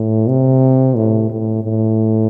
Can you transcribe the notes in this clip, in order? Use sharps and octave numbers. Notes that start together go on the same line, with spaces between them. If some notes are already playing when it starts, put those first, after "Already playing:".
Already playing: A2
C3
A2
A2
A2